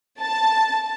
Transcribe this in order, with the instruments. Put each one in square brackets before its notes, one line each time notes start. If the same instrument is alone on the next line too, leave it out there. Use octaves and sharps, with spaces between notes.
[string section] A5